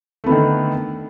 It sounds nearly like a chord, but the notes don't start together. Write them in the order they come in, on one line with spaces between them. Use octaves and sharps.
A3 B3 D3 D#3